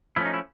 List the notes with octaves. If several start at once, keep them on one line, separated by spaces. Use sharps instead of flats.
F3 A3 C#4 E4
D#4
E4